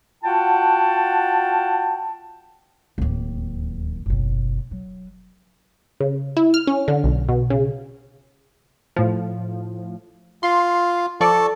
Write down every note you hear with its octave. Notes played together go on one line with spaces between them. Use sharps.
F4 F#4 F#5 G5 A5
D1 D#2
F#1 B1
F#3
C#3
E4
F6
C#4
D3
B1
B2
C#3
A2 F3
F4 C6
F3 A4 D5 C#6